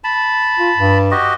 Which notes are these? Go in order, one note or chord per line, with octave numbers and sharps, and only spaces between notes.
A5 B5
F4
G2
F#4 G4 D#5